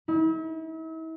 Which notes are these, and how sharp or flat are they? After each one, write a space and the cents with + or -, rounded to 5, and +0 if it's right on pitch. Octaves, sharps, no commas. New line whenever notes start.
E4 -40